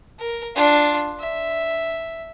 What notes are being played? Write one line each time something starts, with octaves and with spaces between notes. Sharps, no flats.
A#4
D4 F4
E5